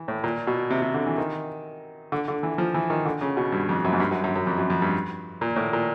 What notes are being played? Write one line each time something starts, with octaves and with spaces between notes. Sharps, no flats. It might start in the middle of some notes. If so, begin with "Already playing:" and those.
Already playing: E3
A2
A#2
B2
C3
C3
D3
E3
D#3
D3
D3
E3
F3
E3
D#3
D3
C#3
B2
G2
F2
F#2
G#2
G2
F#2
F#2
F#2
F2
F#2
F2
G2
A#2
A2
A#2